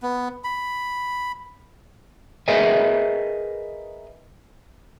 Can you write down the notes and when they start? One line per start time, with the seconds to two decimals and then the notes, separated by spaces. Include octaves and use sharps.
0.03 B3
0.44 B5
2.48 G#4 A#4 B4 D#5 E5 G#5